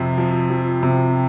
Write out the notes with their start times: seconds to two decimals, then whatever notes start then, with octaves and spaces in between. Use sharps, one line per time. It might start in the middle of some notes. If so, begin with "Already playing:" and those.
Already playing: F2 C3 F3
0.18 F3
0.50 F3
0.83 C3